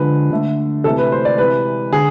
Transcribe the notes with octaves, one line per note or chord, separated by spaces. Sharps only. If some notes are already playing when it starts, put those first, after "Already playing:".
Already playing: D3 F3 G#3 B4
D3 A3
C3 E3 A3 A4
B4
C5
D5
C3 E3 G#3 B4
D3 G#4